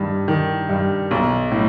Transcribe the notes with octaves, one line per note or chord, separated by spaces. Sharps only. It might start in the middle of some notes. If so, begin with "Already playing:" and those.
Already playing: G2 D#3
D#3
G2
B1
A2